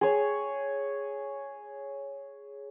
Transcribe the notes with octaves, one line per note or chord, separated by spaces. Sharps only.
G#4 C#5